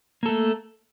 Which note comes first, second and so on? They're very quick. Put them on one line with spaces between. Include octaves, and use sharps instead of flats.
A#3 A4 A3